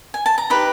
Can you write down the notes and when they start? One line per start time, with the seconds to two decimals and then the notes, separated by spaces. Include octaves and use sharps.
0.14 G#5
0.26 A5
0.38 A#5
0.50 D#4 G4 B4 B5